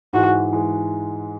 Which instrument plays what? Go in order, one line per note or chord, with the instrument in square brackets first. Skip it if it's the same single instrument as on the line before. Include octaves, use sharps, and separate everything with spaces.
[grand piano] G#2 E3 G#3 [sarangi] F#4
[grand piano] E3 G#3